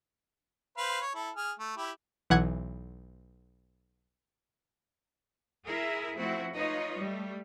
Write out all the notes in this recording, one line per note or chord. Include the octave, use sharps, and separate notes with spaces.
B4 C5 F5
C#5
E4 A4
G#4 F6
A3
E4 G4
B1 E3 F#5 F#6 G#6
E4 G#4 A#4 E5
F3 A3 C4 E4 F#4
D#4 F4 B4 C#5 D#5
G3 A3